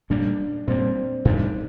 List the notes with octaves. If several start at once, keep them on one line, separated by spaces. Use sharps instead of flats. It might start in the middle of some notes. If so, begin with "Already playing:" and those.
A#2 G3 A#3 D4
A#2 G3 A#3 C4
A2 G3 D4 D#4